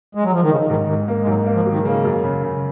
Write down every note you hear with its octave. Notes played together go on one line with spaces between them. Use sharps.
G#3
F#3
F3
D#3
C#3 D#4
G#2 D#3
G#2 D#3
A#3
G#3
G#2 F#3
A#3
F3
D#3 F#3
C#3
A#3
F#2
C#3
C#3